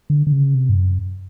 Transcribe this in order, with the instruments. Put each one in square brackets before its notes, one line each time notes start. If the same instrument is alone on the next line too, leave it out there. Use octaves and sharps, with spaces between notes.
[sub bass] D3
D3
C#3
C3
G2
F#2